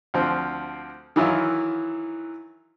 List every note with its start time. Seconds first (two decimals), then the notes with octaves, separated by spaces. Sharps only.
0.14 D2 F3 C4
1.16 D#3 E3 F#3 E4 F4